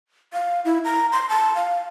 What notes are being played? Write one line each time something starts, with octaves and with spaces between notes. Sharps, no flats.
F5
E4
A#5
C6
A5
F5